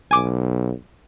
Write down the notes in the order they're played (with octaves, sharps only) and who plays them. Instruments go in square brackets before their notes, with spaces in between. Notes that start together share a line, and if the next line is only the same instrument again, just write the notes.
[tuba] B1 [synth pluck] G#5 D6